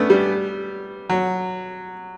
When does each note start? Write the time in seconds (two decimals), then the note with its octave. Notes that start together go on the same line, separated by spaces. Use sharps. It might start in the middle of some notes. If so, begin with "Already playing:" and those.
Already playing: A3 B3 C#4 D4
0.10 G3
1.10 F#3